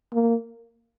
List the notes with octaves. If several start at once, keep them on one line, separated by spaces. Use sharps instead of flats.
A#3